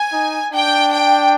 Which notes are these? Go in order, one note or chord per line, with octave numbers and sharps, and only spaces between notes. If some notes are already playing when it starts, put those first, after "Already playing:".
Already playing: G#5
D#4
D4 G5
G5